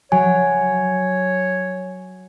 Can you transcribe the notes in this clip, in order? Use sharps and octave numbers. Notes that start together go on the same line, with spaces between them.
F#3 C#5 G#5